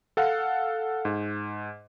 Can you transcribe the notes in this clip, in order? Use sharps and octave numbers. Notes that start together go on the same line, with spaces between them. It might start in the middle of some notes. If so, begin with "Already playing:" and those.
A4 F5 F#5
G#2